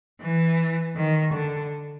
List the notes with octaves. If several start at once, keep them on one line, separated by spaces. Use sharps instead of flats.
E3
D#3
D3